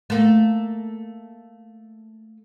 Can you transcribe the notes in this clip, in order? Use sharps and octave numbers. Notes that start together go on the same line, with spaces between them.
A3 A#3